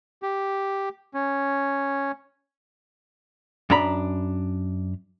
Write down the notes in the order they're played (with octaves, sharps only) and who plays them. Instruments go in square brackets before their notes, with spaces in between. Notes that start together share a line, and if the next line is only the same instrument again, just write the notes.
[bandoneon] G4
C#4
[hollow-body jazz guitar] F#2 D4 A#5 B5